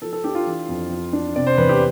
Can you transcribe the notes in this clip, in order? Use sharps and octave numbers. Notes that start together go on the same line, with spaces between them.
F3 A4
A4
D4 G4
F4
E3
F2
F3
D4
C3 D5
C5
E2 B4
G4